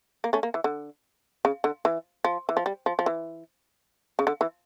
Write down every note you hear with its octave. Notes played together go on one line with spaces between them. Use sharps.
A#3
A3 C#4
A#3
E3
D3
C#3
D3
E3
F3
E3
F3
G3
F3
F3
E3
C#3
D3
E3